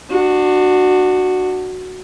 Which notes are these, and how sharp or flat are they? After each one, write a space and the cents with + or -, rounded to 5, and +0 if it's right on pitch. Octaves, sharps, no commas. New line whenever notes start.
D4 +30 F#4 +0